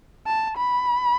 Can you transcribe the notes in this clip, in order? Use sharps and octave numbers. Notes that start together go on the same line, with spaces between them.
A5
B5